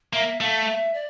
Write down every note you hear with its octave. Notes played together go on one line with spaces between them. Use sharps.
A#3 E5
A3 F5
E5
D5